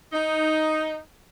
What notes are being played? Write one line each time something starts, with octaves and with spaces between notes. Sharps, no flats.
D#4